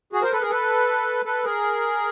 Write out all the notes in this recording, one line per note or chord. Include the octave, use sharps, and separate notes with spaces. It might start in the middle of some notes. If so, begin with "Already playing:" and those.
F#4 G#4
A#4 C5
A4 B4
G#4 A#4
A4 B4
A4 B4
G#4 A#4